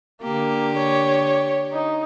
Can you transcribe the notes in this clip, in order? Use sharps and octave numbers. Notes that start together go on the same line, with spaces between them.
D3 A#3 G4
C#5
D#4